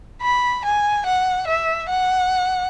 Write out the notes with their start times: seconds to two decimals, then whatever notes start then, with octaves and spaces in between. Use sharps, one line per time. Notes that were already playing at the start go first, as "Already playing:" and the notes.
0.23 B5
0.65 G#5
1.06 F#5
1.48 E5
1.90 F#5